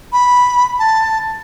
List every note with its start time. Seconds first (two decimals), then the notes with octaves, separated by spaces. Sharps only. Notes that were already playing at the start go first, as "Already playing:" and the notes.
0.12 B5
0.79 A5